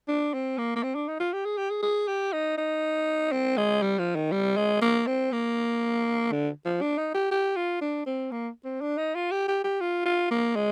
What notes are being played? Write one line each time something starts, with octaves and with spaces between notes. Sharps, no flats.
D4
C4
A#3
A#3
C4
D4
D#4
F4
G4
G#4
G4
G#4
G#4
G4
D#4
D#4
C4
G#3
G3
F3
D#3
G3
G#3
A#3
C4
A#3
D3
F3
D4
D#4
G4
G4
F4
D4
C4
A#3
C4
D4
D#4
F4
G4
G4
G4
F4
F4
A#3
G#3